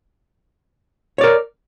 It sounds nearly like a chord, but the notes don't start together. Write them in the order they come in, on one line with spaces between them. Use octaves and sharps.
C#5 D5 A#4